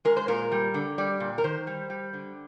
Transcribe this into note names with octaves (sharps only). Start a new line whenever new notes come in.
G#3 A#4
C5
A#2 A#4
G3
D3
G3 D5
A#2
A#4
D#3 C5
G3
G3
D3